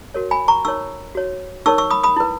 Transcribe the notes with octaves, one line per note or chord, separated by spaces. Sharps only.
F#4 A#4 C#5
G#5 B5
A#5 C#6
D#4 A#4 C#5 C#6 E6
F#4 C#5
D#4 A#4 C#5 C#6 E6
C#6 E6
B5 D#6
B5 D#6
E4 B4